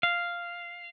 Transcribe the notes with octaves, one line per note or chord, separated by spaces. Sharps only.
F5